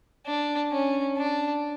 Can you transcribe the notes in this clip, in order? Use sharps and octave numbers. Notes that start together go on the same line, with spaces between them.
D4
C#4
D4